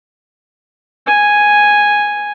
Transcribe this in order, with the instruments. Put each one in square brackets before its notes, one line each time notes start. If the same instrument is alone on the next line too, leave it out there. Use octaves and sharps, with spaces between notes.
[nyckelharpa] G#5